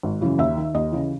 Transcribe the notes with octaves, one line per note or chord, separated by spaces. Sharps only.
G#1
F#2 C#3 E3
D#2 E5
D#3
D#2 D#5
C#3 E3